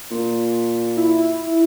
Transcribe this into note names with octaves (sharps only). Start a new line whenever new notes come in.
A#2
E4